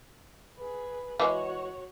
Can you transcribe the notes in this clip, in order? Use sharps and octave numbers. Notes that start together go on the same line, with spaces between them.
G#4 B4
E3 G#3 F#4 C#5